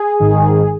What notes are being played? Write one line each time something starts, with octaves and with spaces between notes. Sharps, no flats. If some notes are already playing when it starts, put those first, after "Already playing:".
Already playing: G#4
G#1 G#2 D#3